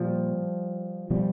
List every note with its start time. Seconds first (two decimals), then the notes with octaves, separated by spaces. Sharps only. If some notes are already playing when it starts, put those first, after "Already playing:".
Already playing: A#2 F3 G3
1.10 B2 F3 G3